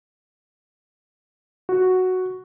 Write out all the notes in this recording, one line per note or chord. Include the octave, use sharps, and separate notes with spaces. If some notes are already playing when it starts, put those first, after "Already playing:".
F#4